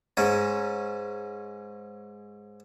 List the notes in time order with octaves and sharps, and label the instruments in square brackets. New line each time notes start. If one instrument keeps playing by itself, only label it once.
[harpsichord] G#2 C#4